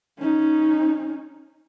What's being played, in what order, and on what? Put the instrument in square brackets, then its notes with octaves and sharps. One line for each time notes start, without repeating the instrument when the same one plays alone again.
[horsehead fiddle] C#4 D#4